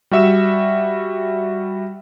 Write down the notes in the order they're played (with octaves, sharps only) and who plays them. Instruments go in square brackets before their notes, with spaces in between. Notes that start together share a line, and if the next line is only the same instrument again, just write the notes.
[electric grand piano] G3 F#4 E5 E6 E7